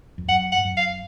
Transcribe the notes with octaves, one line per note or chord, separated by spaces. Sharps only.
F2
F#2 F#5
F#5
G#2
F#2
F5